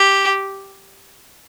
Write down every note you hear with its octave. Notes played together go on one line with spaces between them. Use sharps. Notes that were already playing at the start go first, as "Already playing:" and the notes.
Already playing: G4